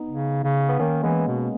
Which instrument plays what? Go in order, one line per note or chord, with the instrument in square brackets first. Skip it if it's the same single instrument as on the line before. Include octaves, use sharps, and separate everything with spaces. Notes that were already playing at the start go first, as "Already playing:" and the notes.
Already playing: [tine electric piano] B3 D#4
[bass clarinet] C#3
C#3
[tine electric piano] B3
[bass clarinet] D#3 [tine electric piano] A#3 C#4
[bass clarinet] E3 [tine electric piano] G#3 B3
[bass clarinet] B2